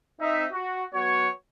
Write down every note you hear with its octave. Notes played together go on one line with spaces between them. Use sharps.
C4 D#4 E5
F#4
F#3 B3 F#4 C#5